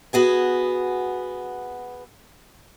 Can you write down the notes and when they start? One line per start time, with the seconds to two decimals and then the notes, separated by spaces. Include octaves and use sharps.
0.13 B3 F#4 G#4 G#5